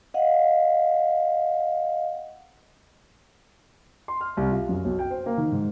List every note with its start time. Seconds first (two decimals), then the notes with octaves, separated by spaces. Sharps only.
0.14 D#5 F5 F#5
4.08 C6
4.21 F6
4.37 C2
4.51 F4
4.69 F#2
4.85 B1
4.99 G5
5.11 C5
5.26 A#3
5.38 D#3
5.52 G#2